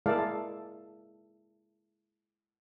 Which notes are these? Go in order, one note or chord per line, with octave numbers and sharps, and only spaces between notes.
G#3 A#3 E4 A4 D5 F5